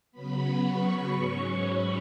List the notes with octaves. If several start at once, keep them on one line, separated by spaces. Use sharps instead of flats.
C#3 F#3 B3 B5
C#6
G#2 F#3 C#4
B5